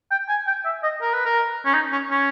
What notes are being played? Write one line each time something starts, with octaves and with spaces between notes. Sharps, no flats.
G5
G#5
G5
E5
D#5
A#4
B4
A#4
C#4
D#4
C#4
C#4